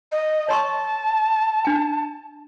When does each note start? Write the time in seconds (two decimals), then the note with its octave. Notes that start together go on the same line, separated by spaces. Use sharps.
0.12 D#5
0.48 C#5 A5 C6 C#6
1.65 D4 G#5